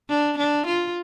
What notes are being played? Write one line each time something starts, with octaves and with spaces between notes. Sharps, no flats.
D4
D4
F4